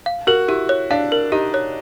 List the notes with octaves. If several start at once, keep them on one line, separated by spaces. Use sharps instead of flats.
F5
F#4 A#4
E4 G4
C#5
D4 F5
A#4
D#4 G4
C#5